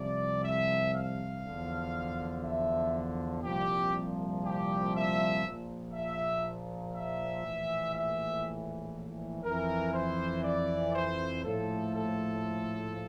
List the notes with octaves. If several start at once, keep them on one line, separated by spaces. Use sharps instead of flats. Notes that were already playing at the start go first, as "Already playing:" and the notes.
Already playing: C2 C3 F3 D5
E5
F5
E2 D3 F3
E5
C2 A#2 F3 G4
G4
E5
A#1 A#2 F3
E5
E5
A#1 A2 E3
E5
F2 E3 A#4
C5
D5
C5
A#1 A2 F3 A4
A4